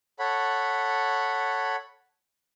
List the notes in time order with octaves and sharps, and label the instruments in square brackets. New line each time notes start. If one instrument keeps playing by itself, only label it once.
[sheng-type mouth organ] A4 C#5 F#5 B5